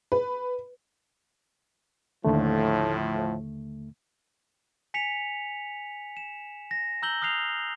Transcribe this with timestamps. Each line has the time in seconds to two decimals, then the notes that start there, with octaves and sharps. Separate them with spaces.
0.12 B4
2.24 D#2 A2 D3 F3 A3
4.94 G#5 B6 C#7 F7
6.17 E7
6.71 A#6
7.02 A#5 E6 G6 F#7 G7
7.22 D#6 F6 F#6 C7 F7